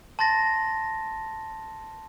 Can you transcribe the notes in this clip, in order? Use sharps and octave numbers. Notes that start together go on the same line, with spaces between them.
A5 C6 A6 A#6